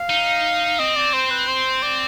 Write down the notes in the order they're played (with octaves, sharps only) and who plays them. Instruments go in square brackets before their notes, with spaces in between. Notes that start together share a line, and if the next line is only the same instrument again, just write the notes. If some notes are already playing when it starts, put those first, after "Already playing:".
Already playing: [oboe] F5
[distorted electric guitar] D#4
[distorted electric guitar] C4 [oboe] D#5
[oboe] D5
C5
B4
C5
D5